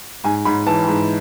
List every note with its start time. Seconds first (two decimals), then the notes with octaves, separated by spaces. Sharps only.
0.24 G#2 G#5
0.45 G#2 B5
0.66 E3 A5
0.87 G#2